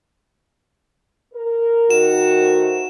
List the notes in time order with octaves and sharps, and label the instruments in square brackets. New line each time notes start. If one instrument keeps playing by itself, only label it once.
[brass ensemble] A#4
[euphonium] D#3 [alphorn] F#4 [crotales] E7
[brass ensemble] A3 A#4 C5